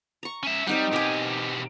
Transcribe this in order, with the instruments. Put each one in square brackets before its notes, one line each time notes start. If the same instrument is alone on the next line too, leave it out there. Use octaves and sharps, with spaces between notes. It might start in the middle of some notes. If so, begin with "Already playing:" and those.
[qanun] A#5 C#6
[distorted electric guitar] C#4 E5
[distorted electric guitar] G3 [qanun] C4 D#4 F#5
[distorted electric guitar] B2 G4 [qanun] A#4 G#5